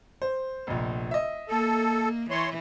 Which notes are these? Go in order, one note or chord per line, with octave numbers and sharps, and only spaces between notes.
C5
F1 A#1
D#5 E5
A#3 A4
E3 C#5 C6